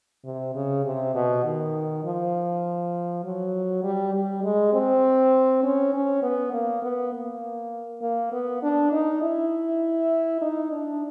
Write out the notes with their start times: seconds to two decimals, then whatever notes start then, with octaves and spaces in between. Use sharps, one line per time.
0.25 C3
0.55 C#3
0.85 C3
1.15 B2
1.44 D#3
2.04 F3
3.24 F#3
3.84 G3
4.14 G3
4.44 G#3
4.74 C4
5.63 C#4
5.93 C#4
6.23 B3
6.52 A#3
6.83 B3
7.13 A#3
8.02 A#3
8.33 B3
8.63 D4
8.92 D#4
9.22 E4
10.42 D#4
10.71 D4